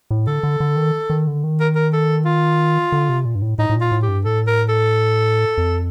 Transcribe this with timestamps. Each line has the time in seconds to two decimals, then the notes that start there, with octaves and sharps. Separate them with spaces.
0.11 A2
0.27 D3 A4
0.43 D3
0.60 D3
0.76 D#3
1.10 D#3
1.27 D3
1.44 D#3
1.60 A#4
1.75 A#4
1.93 A4
2.25 F4
2.92 D3
3.09 C3
3.25 A#2
3.35 G2
3.42 A2
3.58 A2 D#4
3.70 A2
3.76 A#2
3.81 F4
3.92 A2
4.03 G4
4.09 G2
4.25 A2 A4
4.47 A#4
4.69 A4
5.58 F2